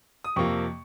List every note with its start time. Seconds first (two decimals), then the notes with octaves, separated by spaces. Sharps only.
0.24 D#6
0.36 F2 C3 F3 A#3 C#6